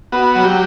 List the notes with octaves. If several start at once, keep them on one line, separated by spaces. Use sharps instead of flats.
B3 F#4
F#3
G4